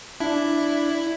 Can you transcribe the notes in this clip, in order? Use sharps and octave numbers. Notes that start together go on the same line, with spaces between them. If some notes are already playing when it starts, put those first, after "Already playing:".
D4 E4